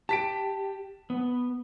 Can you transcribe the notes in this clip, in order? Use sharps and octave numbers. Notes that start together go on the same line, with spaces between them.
G4 A5 B6 D7
B3